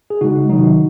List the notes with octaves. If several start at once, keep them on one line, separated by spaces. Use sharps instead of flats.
G#4
C#3 G#3 D#4 F#4
C3 D#3 F#3 D#4 F#4